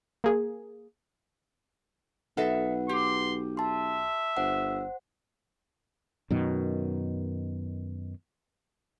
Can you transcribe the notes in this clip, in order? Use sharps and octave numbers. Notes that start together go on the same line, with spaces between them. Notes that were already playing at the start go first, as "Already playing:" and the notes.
A#3 G#4
B1 A4 B4 D#5 E5 F#5
G4 C6
E5 A5 C6
G1 C5 F#5
F#2 B2 D#3